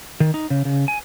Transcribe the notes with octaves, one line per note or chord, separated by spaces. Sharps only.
D#3
D#4
C#3
C#3
G#5